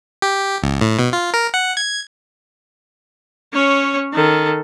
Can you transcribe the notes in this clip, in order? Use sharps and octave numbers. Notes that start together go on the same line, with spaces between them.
G4
C#2
A2
B2
F4
A#4
F#5
G#6
C#4 C#5
D#3 A4